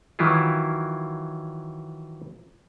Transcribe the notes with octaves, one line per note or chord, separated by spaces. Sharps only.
D#3 E3 F#3 E4 F4